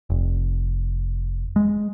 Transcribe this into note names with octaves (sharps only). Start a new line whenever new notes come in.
F1
G#3